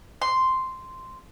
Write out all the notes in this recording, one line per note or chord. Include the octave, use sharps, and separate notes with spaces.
C6